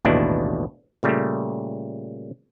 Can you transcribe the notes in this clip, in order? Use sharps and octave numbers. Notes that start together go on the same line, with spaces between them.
A1 D#2 G#2 B2 D4 E4
A#2 C#3 G3 A3